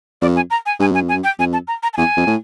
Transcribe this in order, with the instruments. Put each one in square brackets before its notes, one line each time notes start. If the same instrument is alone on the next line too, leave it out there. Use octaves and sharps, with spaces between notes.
[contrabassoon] F2 [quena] D5
[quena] G#5
A#5
G#5
[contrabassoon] G2 [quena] G#5
[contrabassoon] F#2 [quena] G#5
[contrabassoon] F2
[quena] G#5
[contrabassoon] F#2
[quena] G5
[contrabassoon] F2 [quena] G#5
[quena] A5
A#5
A#5
A5
[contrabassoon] E2 [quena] G#5
[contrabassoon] F2
A2